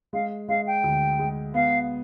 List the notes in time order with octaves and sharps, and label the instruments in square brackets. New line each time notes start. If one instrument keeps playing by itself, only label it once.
[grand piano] G#3 [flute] F5
[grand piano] G#3 [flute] F5
[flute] G5
[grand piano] D2
G#3
[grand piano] B3 [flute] F5